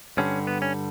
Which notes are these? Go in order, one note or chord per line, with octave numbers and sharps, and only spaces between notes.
G2 D3 G3 C#4
B3
C#4